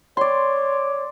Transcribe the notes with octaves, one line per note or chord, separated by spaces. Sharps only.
C#5 D5 C6